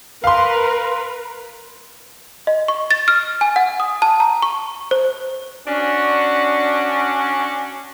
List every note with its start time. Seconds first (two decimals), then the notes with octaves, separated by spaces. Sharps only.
0.24 A#4 B4 F5 C6
2.47 D#5
2.68 C#6
2.91 A6
3.08 F6
3.41 G#5
3.56 F#5
3.80 D#6
4.02 A5
4.20 A#5
4.42 C#6
4.91 C5
5.68 C#4 D4 F#4